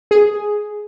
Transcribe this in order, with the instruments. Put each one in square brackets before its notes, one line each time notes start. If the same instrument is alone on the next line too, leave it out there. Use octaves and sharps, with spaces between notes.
[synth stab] G#4